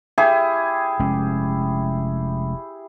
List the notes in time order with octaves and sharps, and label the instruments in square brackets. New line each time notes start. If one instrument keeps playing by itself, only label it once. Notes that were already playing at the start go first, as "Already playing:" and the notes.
[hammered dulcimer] E4 G4 G#4
[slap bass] F1 G#3 C#4